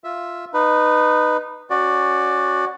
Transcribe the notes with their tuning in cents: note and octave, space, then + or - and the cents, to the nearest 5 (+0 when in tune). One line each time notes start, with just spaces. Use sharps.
F4 +0 E5 +0
D#4 -20 B4 +5
C#4 +0 F#4 +0 D5 +15